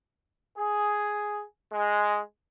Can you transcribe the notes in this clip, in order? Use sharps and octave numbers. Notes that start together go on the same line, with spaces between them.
G#4
G#3